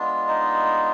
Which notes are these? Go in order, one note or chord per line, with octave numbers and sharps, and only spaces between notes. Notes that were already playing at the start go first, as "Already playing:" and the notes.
Already playing: G#3 B3 D4 F4
D#4 D#5